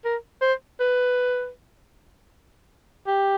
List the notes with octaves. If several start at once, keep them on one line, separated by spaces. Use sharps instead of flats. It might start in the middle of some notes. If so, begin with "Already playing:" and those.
A#4
C5
B4
G4